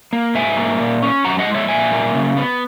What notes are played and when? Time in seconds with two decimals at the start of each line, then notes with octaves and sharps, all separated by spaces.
0.13 A#3
0.35 G#2 E5 G#5
0.57 A#3
0.80 A#2
1.02 C#4
1.24 F#2 F#5 A#5
1.39 D#5 F#5
1.47 G#3
1.54 C#5 E5
1.69 A#2 E5 G#5
1.92 A#3
2.15 C#3
2.37 B3